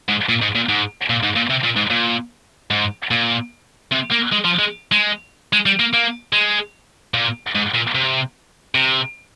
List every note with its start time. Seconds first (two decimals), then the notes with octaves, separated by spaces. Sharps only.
0.08 G#2
0.29 A#2
0.42 G#2
0.55 A#2
0.69 G#2
1.10 A#2
1.23 G#2
1.36 A#2
1.50 C3
1.63 A#2
1.76 G#2
1.90 A#2
2.71 G#2
3.11 A#2
3.92 C3
4.11 A#3
4.32 G#3
4.44 F3
4.59 G#3
4.92 G#3
5.53 G#3
5.66 G3
5.80 A#3
5.93 A#3
6.33 G#3
7.14 A#2
7.55 G#2
7.74 A#2
7.95 C3
8.75 C3